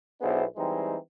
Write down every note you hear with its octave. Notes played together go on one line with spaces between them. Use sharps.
B1 B3 D4 E4 G#4 C5
E3 G3 G#3 C4 D#4